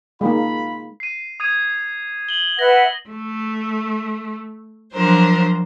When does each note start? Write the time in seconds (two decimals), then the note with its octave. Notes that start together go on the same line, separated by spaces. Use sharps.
0.21 G#3 A#3 D#4 F4 B5
1.00 C7 D#7
1.40 D#6 G#6 D#7
2.29 F#7 G7
2.59 B4 E5 F#5 A#6
3.10 A3
4.92 F3 F#3 D4 A#4 C5